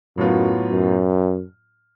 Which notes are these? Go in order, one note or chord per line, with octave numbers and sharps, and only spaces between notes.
F#2 A2 F#3 B3 F4
F#2